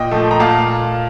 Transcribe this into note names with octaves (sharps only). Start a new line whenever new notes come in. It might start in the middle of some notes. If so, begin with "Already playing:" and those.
Already playing: A#2 D#5 G5
F3 A3
A#5
A#2 F5 A5